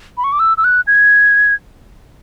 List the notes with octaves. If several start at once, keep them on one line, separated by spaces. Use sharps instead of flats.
B5
C#6
D6
E6
E6
F#6
G#6